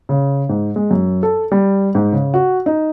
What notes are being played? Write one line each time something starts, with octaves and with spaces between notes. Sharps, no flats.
C#3
G#2
G#3
F#2
A4
G3
G#2
C#3
F#4
D#4